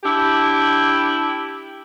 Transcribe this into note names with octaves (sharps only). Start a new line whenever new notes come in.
D4 E4 G4